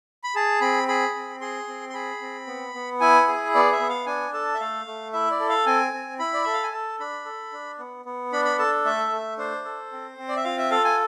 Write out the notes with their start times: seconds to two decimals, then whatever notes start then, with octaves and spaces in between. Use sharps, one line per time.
0.24 B5
0.35 G#4 A5
0.61 C4 B5
0.88 G#4 B5
1.15 C4
1.41 G#4 C6
1.68 C4
1.89 C6
1.94 G#4 B5
2.22 C4
2.47 B3
2.74 B3
3.00 E4 G#5
3.28 G#4
3.54 B3 D5
3.72 E5
3.80 B3
3.89 F5
4.06 D4 G#5
4.34 A4 A5
4.54 E5
4.60 A3 F5
4.87 A3
5.13 E4 E5
5.31 D5
5.40 A4
5.49 F5
5.66 C4 G#5
5.93 C4
6.19 E4 B5
6.33 D5
6.43 A4 E5
6.53 F5
6.63 G#5
6.72 A4 A5
7.00 D4 B5
7.25 A4
7.52 D4
7.79 B3
8.05 B3
8.32 D4 B5
8.45 B5
8.59 A4 A5
8.85 A3 E5
9.11 A3
9.38 D4 C5
9.65 A4
9.92 C4
10.18 C4
10.28 D5
10.36 E5
10.44 F4 F5
10.58 E5
10.71 A4 F5
10.84 G#5